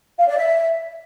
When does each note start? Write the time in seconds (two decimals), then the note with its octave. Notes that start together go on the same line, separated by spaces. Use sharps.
0.19 F5
0.28 D5
0.38 E5